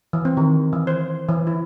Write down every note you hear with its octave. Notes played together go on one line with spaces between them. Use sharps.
E3
C4
D#3
E3
C5
E3
E4